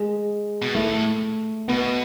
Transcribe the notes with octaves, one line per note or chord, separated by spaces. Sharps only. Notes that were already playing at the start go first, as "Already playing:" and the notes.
Already playing: G#3
B2
A2 A3
B2 B3